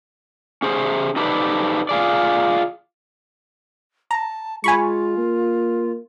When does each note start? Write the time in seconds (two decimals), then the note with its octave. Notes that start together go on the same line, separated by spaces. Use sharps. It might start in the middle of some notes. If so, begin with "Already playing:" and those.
0.62 C#4 G#4 C5
1.16 D#4 G4 A4 B4 C5 D5
1.89 F4 G#4 D5
4.11 A5 A#5
4.64 G#3 F4 G#5 B5 C#6
5.17 A#3